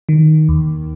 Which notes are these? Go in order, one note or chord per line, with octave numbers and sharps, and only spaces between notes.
D#3
D#2